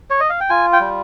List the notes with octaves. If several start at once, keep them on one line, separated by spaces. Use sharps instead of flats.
C#5
D#5
F5
G5
F4 G#5
G5
G3